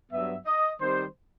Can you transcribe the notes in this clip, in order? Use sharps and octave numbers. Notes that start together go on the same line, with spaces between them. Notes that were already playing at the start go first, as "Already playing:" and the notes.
G2 F#3 B3 E5
D#5
D#3 G3 C4 C5